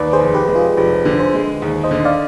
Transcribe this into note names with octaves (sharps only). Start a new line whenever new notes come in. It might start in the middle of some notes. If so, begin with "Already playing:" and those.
Already playing: D#2 B4 D5
G#4 C5
F1
G4 B4
G#3 G4
F4 G#4
F1 G4 B4
D3
G#4 C5
G#3
D#2
C5 D#5
D3
D5 F5